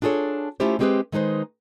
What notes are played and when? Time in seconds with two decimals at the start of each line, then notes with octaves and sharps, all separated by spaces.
0.02 D4 F4 G#4 A4 C#5
0.60 A3 C#4 E4 F4 G4 C5
0.79 G3 G#3 C4 G4 G#4 B4
1.12 D#3 G#3 D#4 B4 C5